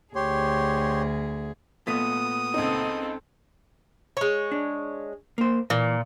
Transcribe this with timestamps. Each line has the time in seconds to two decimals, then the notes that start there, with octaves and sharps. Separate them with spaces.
0.15 D2 G4 G#4 C#5 C6
1.87 A#2 A3 B3 D#6
2.54 C#2 C4 D#4 A4
4.17 G#3 C#5
4.52 D4
5.38 A#3 C5
5.70 A#2 E3